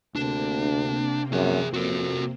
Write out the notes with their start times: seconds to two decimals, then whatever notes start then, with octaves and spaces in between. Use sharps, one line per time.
0.16 D2 C3 A#3 C4 D4
1.33 F#2 G#4 E5
1.74 F2 F#4 A#4